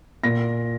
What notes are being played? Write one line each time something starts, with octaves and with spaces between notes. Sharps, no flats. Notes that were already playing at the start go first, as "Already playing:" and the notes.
A#2 A#6